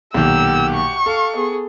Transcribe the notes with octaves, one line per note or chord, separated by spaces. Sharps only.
B1 A#2 D#3 G4 F#5 E6
C#6
A4 F5
B3 G#4